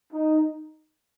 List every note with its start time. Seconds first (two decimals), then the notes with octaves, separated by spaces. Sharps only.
0.13 D#4